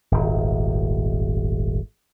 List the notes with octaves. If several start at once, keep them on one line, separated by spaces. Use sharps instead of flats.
D#1 G#1